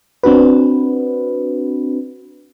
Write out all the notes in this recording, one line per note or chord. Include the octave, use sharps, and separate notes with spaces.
C4 D4 F#4 B4